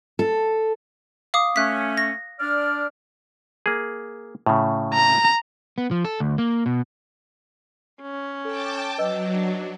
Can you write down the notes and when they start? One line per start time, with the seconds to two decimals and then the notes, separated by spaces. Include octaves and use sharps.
0.19 A4
1.34 F5 D6 D#6
1.56 A3 C#4 F#6 B6
1.97 A#6
2.40 D4 D5 F6
3.66 A#3 G#4
4.46 A2 C#3
4.94 A#5
5.78 B3
5.91 F3
6.05 A4
6.20 D2
6.38 A#3
6.66 B2
8.02 C#4
8.45 A4 G5 A5 D6
8.98 F#3 B4 D#5 E6
9.32 D4